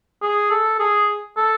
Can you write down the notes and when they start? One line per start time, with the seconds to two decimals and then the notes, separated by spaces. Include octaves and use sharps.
0.22 G#4
0.51 A4
0.79 G#4
1.37 A4